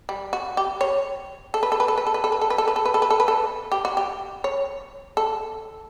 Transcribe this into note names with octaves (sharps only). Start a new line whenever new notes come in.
G3
F#4
G4
C#5
A4
B4
A4
B4
A4
B4
A4
B4
A4
B4
A4
B4
A4
B4
A4
B4
A4
B4
A4
B4
A4
G4
F#4
G4
C#5
A4